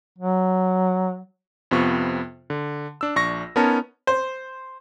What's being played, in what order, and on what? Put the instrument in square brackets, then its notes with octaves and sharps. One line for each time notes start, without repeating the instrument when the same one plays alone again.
[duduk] F#3
[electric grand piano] F2 C3 B3 F4 C#6
D3
D4 E6
A#1 D4 C#6 A#6
B3 C#4 D#4 A#4 C#5 A5
[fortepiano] C5